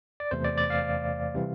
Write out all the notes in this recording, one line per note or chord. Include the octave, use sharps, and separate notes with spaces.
D5
E2 C3 E3 A3 C5
D5
D5
F5
C3 E3 G3 C4